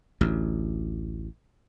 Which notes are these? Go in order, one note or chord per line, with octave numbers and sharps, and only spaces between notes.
A1 D2